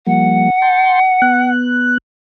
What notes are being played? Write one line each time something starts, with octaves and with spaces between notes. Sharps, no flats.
F3 G3 A#3 F#5
G5 A5 C6
B3 F#6